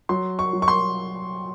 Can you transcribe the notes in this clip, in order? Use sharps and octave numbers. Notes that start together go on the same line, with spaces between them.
F#3 C6
C#6
F#3
C#6
C6